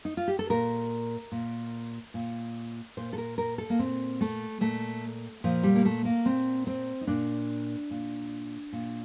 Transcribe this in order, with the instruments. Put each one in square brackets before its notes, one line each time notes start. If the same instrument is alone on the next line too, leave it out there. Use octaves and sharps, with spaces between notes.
[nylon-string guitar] D#4
F4
G4
A4
A#2 A#4
A#2
A#2
A#2 C5
A4
A#4
A#4
A4
A#3
A#2 C4
A3
A#2 A3
A#2 F3
G3
A#3
A3
A#3
A#2 C4
C4
D#4
A#2 D4
A#2
A#2